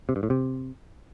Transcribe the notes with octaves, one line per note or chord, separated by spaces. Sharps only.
C3
G2
A2
C3